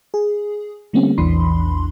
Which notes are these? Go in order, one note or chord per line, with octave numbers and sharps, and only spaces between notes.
G#4
D3 G3 A3 A#3 C4 C#4
A#1 E2 E3 D4 B5 C6